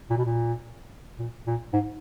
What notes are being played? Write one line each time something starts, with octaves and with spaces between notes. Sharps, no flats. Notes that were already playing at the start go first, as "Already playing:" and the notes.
A#2
B2
A#2
A#2
A#2
G#2